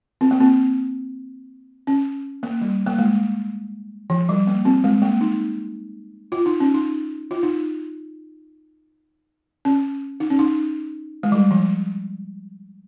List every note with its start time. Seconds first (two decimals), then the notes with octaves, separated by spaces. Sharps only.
0.21 C4
0.31 A#3
0.40 C4
1.87 C#4
2.43 A#3
2.61 G3
2.87 A#3
2.98 G#3
4.10 F3
4.29 G3
4.47 A#3
4.65 C4
4.84 G#3
5.02 A#3
5.21 D#4
6.32 F4
6.46 D#4
6.60 C#4
6.74 D#4
7.31 F4
7.43 D#4
9.65 C#4
10.20 D#4
10.30 C#4
10.39 D#4
11.23 G#3
11.32 G3
11.51 F3